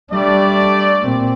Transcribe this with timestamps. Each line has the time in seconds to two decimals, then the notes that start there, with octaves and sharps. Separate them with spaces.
0.12 G3 A3 D4 D5
1.01 A#2 C4